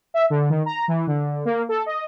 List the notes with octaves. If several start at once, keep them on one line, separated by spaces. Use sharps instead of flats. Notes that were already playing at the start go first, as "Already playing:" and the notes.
E5
D3
D#3
A#5
E3
D3
A#3
A4
D#5